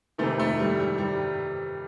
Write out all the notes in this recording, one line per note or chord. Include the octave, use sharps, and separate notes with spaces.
F2 C3 D#3 A3
A3
G3
G3
G3